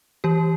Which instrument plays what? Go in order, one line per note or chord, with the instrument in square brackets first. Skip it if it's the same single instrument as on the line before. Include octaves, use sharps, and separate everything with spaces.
[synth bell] E3 G4